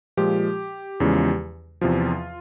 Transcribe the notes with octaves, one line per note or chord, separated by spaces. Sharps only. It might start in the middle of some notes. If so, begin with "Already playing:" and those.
A#2 F3 G#3 G4
E2 C#3 F3 G#3
E2 C3 F3 F4